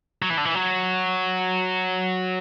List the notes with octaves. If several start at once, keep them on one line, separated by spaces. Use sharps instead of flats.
F#3
E3
D3
E3
F#3